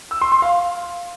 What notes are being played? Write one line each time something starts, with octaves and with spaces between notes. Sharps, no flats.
E6
C6
C6
F5